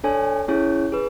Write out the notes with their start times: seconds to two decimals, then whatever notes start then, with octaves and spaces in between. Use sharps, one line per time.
0.04 D4 A4 C#5 G#5
0.48 C#4 E4 G#4 C#5
0.92 G#4 B4